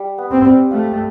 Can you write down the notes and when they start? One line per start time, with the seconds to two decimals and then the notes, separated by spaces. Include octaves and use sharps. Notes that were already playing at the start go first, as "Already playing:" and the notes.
Already playing: G3
0.18 B3
0.31 C4
0.45 G3
0.71 A3 F4